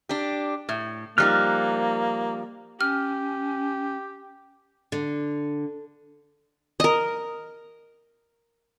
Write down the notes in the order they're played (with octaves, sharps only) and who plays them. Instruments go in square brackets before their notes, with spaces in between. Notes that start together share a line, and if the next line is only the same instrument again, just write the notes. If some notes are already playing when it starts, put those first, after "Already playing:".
[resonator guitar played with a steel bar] D4 G4
A2
[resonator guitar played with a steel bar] F3 G3 D#4 [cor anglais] A#3 [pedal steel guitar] F6 F#6
[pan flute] C#4 [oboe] G4 [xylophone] F6
[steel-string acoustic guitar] D3
[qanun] A#4 D#5